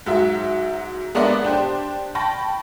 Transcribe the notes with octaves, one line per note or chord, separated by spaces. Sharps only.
G#2 F#3 E5
G#3 B3 D4 A#4 D5 E5
D4 G4 C5
G5 A5 B5 C#6 A#6